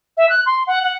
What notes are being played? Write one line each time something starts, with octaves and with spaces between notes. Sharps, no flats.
E5
F#6
C6
F#5
F#5